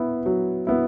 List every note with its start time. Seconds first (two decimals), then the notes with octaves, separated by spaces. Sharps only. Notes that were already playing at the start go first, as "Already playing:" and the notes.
Already playing: B3 E4
0.26 F#3
0.67 B3 E4